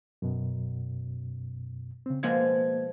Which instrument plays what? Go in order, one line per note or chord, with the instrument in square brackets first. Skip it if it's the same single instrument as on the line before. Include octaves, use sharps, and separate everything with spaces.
[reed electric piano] F#2 B2
C#3 C4
[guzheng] B2 F3 G#3 [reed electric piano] A#3 G#6